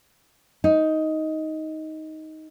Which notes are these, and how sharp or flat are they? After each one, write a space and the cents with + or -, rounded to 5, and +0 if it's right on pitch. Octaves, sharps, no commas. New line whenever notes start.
D#4 +10